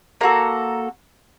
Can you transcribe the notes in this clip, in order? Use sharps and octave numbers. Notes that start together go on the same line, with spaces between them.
A#3 F#4 A4 A#5